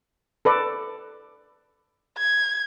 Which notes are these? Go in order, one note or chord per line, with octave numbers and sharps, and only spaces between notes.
A4 B4 D5
G#6